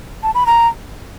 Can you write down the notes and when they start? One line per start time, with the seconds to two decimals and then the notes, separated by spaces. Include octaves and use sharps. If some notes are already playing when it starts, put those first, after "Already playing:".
0.23 A5
0.35 B5
0.46 A#5